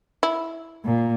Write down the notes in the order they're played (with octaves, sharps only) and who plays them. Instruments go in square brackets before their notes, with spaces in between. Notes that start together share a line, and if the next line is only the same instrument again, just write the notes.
[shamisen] E4
[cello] A#2